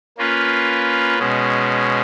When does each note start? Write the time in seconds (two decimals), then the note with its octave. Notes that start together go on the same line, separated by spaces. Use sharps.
0.18 A#3 C#4 F4 B4
1.19 B2 G#3 C#4